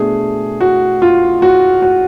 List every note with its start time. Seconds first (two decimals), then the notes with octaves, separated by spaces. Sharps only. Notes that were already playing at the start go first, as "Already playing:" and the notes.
Already playing: B2 A3 D4 G#4
0.61 F#4
1.02 F4
1.42 F#4
1.82 F#4